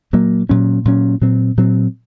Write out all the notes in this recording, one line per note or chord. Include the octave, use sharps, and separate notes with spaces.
A#2 F#3 A#3
A#2 F#3 C#4
A#2 F#3 C#4
A#2 F#3 C4
A#2 F#3 C4